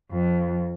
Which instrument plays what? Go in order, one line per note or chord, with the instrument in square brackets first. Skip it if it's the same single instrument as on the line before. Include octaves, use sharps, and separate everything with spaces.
[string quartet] F2